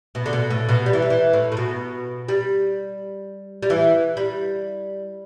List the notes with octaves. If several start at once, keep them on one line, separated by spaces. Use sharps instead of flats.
B2
D3
B2
A2
B2
G3
E3
G3
E3
A2
A2
B2
G3
G3
E3
G3